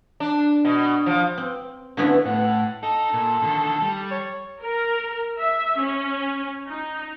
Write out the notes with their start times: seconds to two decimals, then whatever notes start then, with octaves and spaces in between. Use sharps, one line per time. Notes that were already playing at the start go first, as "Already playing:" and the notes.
0.20 D4
0.65 B2
1.06 F3
1.38 C4
1.97 D3 F3 A3 B3 C#4 E4
2.26 A2 F#5
2.83 D#4 A4
3.13 A#2
3.43 D3 D#3
3.82 G3
4.11 C#5
4.62 A#4
5.40 E5
5.81 C#4
6.69 D#4